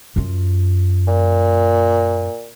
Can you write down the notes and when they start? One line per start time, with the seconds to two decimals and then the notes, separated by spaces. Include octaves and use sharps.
0.16 F#2 F4
1.07 A#2